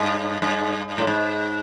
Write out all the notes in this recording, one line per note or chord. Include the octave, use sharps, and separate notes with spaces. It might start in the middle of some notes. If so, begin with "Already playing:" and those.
Already playing: G2
G2
A2
G#2